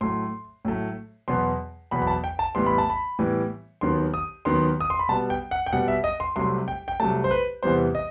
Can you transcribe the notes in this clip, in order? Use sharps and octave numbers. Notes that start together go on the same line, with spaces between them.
A2 F#3 A3 C6
A2 F#3 A3
E2 B2 F#3 B3 C6
E2 B2 F#3 B3 B5
B5
A5
G5
A5
A2 E3 G3 B3 C6
B5
A5
B5
A2 E3 G3 B3
D#2 D#3 F#3 B3 C6
D#6
D#2 D#3 F#3 B3 C6
D#6
C6
B5
B2 G3 B3 A5
G5
F#5
G5
B2 G3 B3 F#5
E5
D#5
C6
C2 C3 F#3 A3 C6
G5
G5
C2 C3 F#3 A3 A5
C5
B4
E2 C3 E3 G3 B3 C5
D#5